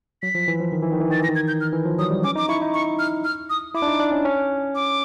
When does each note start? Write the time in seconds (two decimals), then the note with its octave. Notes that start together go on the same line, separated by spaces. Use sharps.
0.22 F#3 B6
0.35 F3
0.48 E3
0.61 F3
0.72 D#3
0.83 E3
0.92 D#3
1.00 E3
1.10 D#3 A6
1.19 E3 A#6
1.28 D#3
1.35 G#6
1.48 G6
1.61 F6
1.73 E3
1.86 F3
1.99 F#3 D#6
2.10 G3
2.24 C#4 D6
2.36 D#4 D6
2.49 E4 C#6
2.62 D#4
2.74 C#6
2.99 F6
3.24 F6
3.50 D#6
3.75 E4 D6
3.82 D4
3.87 D#4
4.00 D4
4.12 C#4
4.25 C#4
4.75 D6